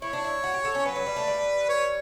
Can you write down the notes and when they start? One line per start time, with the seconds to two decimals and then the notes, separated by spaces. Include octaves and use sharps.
0.02 E4 C#5
0.13 D4
0.24 E4
0.44 F#4
0.54 G4
0.65 A4
0.75 C#4
0.86 F#3 B4
0.96 F#3
1.06 G3
1.16 A3
1.27 G3
1.69 C#5